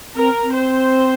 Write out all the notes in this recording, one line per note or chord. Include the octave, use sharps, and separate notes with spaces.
C4 A#4
C4
C5